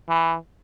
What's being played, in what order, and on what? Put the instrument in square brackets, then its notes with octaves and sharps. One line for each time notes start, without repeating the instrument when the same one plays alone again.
[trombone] E3